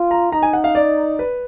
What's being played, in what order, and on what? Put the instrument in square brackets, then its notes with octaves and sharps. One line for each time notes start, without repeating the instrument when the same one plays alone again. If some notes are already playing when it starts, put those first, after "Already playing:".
Already playing: [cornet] F4
[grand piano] A#5
[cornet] D#4 [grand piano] A#5
[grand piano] G#5
F#5
F5
D5
B4